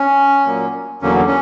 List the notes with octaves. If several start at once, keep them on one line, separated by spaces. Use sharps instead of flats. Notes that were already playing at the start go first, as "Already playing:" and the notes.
Already playing: C#4
A#2 F#3 A#3
E2 D3 F#3 A#3 C#4
C#4